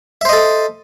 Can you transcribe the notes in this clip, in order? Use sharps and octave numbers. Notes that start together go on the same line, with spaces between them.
A4 C5 D#5 E5